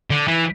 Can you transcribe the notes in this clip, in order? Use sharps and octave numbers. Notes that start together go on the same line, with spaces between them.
D3
E3